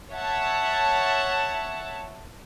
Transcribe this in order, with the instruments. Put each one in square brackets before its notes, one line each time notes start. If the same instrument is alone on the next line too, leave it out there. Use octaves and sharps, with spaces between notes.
[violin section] C#5 E5 F#5 A5